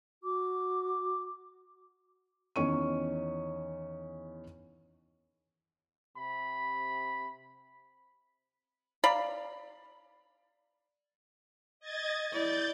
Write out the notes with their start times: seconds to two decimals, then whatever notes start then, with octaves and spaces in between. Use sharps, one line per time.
0.23 F#4 D6
2.56 E2 D#3 C#4 C#6 D#7
6.18 C3 B5
9.04 D5 F5 A#5 B5
11.80 D#5 G#6 A6
12.32 E4 D5 G6 A6